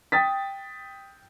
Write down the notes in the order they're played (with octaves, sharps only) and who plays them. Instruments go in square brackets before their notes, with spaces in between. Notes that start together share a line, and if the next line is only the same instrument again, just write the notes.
[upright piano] G5 D#6 A6 B6